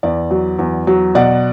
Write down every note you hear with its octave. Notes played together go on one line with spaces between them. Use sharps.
E2 D5
F#3
E2
F#3
B2 D5 F#5